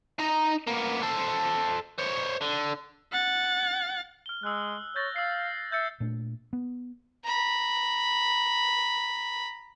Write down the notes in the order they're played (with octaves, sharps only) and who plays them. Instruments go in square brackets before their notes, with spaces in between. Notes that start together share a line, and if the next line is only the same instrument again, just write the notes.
[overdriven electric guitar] D#4 A#5
A#3 B3
A4 C5
C5 C#5
D3
[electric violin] F#5 A6
[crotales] F6 G7
[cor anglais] G#3 [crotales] E6 F#6
[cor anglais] C#5 [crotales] G6 A6 A#6
[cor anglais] F5 [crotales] E6 C7
[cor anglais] E5 [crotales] G6 A6 C#7
[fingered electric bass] A#2 A3 D4
B3
[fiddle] A#5 B5